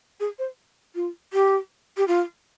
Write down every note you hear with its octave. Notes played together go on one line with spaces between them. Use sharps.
G#4
C5
F4
G4
G4
F4